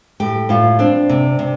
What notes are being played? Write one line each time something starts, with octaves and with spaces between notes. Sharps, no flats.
A2 G4
A2 F4
C4 D4
C3
C3